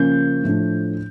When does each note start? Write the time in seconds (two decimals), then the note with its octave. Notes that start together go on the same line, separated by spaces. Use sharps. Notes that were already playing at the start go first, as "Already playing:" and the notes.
Already playing: C#3 F3 A#3 C#4 G6
0.43 A2 F3 A3 D4